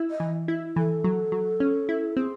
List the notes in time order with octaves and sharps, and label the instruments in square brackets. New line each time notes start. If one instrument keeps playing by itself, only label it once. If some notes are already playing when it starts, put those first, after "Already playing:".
Already playing: [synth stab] E4
[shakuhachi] D#5
[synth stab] E3
E4
[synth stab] E3 [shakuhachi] A4
[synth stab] F#3
F#3
C#4
E4
[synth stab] C4 [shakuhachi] G#4